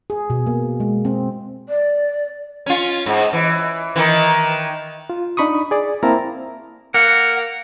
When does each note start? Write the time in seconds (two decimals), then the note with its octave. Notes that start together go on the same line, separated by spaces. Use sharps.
0.10 G#4
0.30 B2
0.47 A#3
0.80 G#3
1.05 C4
1.69 D5
2.66 C#4 F4
3.06 G#2
3.33 E3
3.96 D#3 E3
5.10 F4
5.37 D4 D#4 B5 C#6 D#6
5.71 G#4 D5
6.03 A#3 C4 E4 A#4 A5 A#5
6.94 A#3 F#5